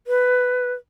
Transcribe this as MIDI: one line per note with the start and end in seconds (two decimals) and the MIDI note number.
0.07 0.73 71